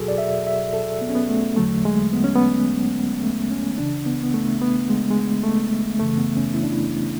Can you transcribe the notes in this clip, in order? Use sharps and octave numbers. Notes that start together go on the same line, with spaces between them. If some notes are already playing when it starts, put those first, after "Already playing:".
Already playing: E2 B2 F#3 F#4 G#4 A4
D5
E5
E5
A4
B3
C#4
B3
A3
E2 D3 F#3 A3
G#3
B3
C#4
B3
A3
C#4
C#2 C#3 E3 D4
B3
B3
A3
B3
G#3
G#3
A3
F#2 C#3 E3 A3
B3
C#4
E4
D4
E4